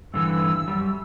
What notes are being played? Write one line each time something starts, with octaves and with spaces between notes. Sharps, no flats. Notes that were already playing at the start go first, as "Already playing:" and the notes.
G2 D3 E3 E6
F#2 G3